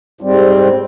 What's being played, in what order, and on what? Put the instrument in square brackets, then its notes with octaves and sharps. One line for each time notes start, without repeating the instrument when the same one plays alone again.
[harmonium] G#2 G3 C4